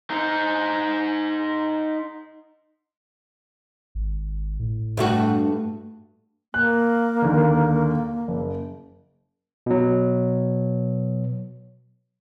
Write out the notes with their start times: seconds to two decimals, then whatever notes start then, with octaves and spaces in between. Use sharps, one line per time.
0.10 D#4 C5
3.95 G#1
4.59 A2
4.97 G2 A3 F#4
6.54 A#3 F#6
7.22 D#2 D3
8.28 F#1
9.66 B2 F#3